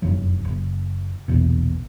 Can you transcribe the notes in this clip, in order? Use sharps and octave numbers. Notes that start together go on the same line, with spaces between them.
F1 F#2 D#3 F#3
F#1
E1 A#1 E2 B2